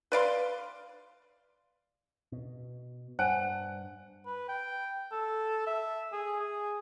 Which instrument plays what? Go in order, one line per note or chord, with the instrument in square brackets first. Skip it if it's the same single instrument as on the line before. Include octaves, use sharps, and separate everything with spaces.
[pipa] B4 D5 F5 C6
[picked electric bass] B2
[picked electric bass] G2 [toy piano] C5 G#5 A5 [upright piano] F#5
[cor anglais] B4
G5
A4
E5
G#4
G#4